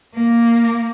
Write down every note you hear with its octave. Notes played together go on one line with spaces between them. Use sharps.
A#3